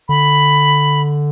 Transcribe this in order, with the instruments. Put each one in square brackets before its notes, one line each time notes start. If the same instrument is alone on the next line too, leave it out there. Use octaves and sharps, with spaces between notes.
[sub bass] D3 [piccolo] B5